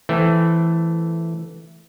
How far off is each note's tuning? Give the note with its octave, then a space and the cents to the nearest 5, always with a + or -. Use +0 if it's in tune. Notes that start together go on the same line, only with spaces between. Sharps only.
E3 +5 A3 +0 C4 +0